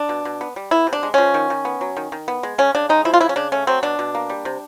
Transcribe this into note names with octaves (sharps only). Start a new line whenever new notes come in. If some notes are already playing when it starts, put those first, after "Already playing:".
Already playing: D4
B2
B2
B3
G3
B3 E4
C3
D4
G#3
F3 C#4
D#3
D#3
B3
F#3
D#3
D#3
B3
G#3
C#3 C#4
C#3 D4
G#3 D#4
F3 E4
F4
C#3 E4
C#4
C#3 D4
A3 C#4
F#3 C4
B2 D4
B2
A#3
G3
C3